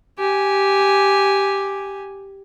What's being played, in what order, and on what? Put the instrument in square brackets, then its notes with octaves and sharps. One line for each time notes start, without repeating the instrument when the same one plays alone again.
[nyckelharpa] G4 G#5